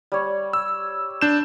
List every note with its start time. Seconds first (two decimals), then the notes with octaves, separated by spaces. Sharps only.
0.12 G3 C#5
0.53 E6
1.21 D4 G6 E7